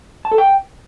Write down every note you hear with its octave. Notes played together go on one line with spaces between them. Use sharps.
A5
A4
G5